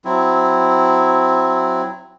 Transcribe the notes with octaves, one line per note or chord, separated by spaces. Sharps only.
F#3 C4 E4